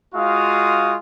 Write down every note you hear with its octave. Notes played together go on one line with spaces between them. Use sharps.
G#3 F4 F#4 F5 D#6